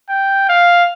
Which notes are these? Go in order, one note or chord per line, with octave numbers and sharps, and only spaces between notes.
G5
F5